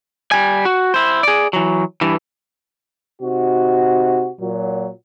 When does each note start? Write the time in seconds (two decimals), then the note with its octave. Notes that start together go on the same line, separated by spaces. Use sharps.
0.32 G3 G#5
0.65 F#4
0.94 E4 C5
1.23 G#4 D5
1.53 E3 F#3
2.01 G2 E3
3.22 C3 D#4 F#4
4.40 A#2 F#3